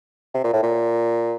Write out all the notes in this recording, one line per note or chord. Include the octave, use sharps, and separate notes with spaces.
C3
A#2
A2
A#2